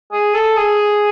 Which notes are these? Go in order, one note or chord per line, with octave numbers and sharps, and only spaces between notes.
G#4
A4
G#4